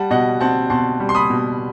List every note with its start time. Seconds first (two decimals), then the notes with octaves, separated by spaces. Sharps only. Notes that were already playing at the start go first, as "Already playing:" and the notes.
Already playing: G3 F#5 A5
0.11 B2 D#5 F#5
0.41 C4 F#5 A5
0.70 B2 A5 C6
1.00 G3
1.09 C6
1.15 B5 D#6
1.30 B2